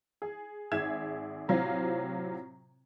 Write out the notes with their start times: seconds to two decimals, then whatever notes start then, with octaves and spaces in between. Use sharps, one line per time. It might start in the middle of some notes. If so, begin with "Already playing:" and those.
0.22 G#4
0.72 G#1 G#4 E5 G#6 E7
1.48 A2 C3 F#3 C4 F4